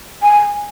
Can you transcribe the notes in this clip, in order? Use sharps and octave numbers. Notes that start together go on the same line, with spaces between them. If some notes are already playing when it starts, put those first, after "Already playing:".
G#5